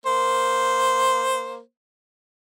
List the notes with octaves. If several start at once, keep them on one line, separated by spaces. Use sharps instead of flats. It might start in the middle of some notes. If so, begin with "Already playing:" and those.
A#3 C5